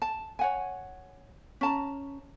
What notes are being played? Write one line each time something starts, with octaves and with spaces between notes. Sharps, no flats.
A5
C#5 F#5 G#5
C#4 A5 A#5